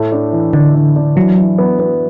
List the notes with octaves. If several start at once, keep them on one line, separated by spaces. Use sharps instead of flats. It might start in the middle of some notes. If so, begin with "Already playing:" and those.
Already playing: A2 A3
D4
E3
D3 D4
D4
D4
E3 F#3
E3
B3
B3